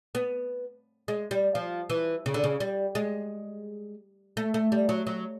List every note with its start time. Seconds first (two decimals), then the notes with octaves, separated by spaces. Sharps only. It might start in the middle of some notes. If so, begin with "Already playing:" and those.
0.15 B3
1.08 G#3
1.31 G3
1.55 F3
1.90 E3
2.26 C#3
2.34 D3
2.44 C#3
2.60 G3
2.95 G#3
4.37 A3
4.54 A3
4.72 G3
4.89 F#3
5.07 F#3